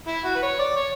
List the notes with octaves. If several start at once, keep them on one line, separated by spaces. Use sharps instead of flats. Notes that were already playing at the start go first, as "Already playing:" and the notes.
E4
F#4
B4
C#5
D5
C#5